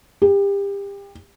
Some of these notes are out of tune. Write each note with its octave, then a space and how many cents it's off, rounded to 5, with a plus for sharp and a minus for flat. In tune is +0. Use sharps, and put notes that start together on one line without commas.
G4 +30